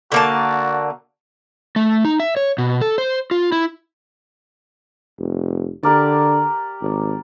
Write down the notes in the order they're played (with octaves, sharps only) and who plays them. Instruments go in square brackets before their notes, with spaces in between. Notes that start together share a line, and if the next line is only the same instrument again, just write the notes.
[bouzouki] D3 A#3 A5 [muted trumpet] F#4
[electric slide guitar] A3
D#4
E5
C#5
B2
A4
C5
F4
E4
[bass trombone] F1
[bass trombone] D3 [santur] G4 A#4 D5
[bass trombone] G#1